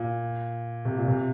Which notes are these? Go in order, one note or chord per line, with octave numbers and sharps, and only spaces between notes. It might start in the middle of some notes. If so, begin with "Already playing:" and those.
Already playing: A#2
C3
A#2
C3